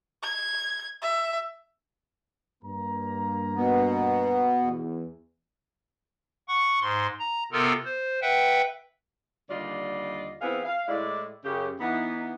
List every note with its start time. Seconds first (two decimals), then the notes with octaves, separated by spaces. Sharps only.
0.23 G#6
1.02 E5
2.62 G2 A#3 A#5
3.56 B2 B3
4.64 E2
6.48 F#5 C#6
6.81 G#2 C6
7.19 A#5
7.52 C3 B3 F4 A4 A#4
7.85 C5
8.22 B4 E5 F#5 G5
9.50 D#2 D3 G3 F4 D5 D#5
10.42 E2 B3 C4 E4 G#4 F5
10.65 F5
10.88 A2 G#3 E4 D5
11.44 F#2 C#3 G4
11.80 E3 B3 D#4